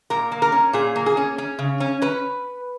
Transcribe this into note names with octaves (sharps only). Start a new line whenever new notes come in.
A#2 A#4
A#3
A#4
C#4
A#2 G#4
A#3
G#4
C#4
C#4
C#3
C#4
C#4 B4